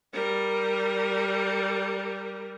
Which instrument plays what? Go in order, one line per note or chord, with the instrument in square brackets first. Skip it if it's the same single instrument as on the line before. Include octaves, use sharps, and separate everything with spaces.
[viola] G3 A#4